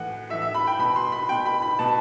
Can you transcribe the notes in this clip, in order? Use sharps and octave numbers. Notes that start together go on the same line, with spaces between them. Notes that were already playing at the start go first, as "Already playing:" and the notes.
Already playing: A2 E3 F#5
A2 E3 E5
E5
B5
G5
B2 B5
C6
B5
B2 G5
B5
B5
B2 A5